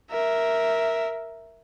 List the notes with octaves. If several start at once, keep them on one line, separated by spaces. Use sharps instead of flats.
A#4 E5